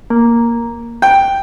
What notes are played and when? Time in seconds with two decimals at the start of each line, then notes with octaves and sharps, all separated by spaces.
0.10 A#3
1.02 G5